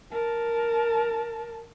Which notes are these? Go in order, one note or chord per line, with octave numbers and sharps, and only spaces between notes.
A#4 A5